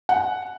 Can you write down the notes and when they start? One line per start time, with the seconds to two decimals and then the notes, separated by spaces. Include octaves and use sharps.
0.09 F#5